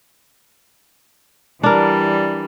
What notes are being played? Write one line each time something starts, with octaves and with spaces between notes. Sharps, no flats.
E3 G3 D4 A#4